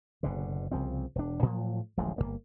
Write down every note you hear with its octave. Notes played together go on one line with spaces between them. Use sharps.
F#1 B2 D3
C2 C#3 F3 C4
E1 D4
A2 F3 F#3
D1 A1 F3 G#3
G1 F#2 A#3